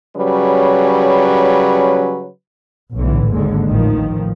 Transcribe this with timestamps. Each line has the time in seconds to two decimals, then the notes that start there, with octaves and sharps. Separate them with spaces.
0.17 C#3 F#3 G3 C#4 B4
2.95 B1 A2 D3 E3
3.30 G#1 D#2 D3 G#3
3.68 A1 D#3 F3